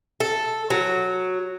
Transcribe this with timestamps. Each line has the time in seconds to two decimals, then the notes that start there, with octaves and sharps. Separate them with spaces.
0.20 A4
0.70 F#3